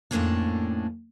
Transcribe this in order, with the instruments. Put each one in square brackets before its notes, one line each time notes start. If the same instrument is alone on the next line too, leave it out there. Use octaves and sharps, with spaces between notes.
[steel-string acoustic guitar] F2 A2 A3 A#3 C#4 D4